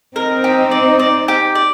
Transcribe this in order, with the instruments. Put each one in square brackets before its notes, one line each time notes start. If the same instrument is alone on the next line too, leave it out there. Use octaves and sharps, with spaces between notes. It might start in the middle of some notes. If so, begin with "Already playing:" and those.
[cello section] C4 D#4 [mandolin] A#4
[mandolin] G4
D5
D5
G4
D5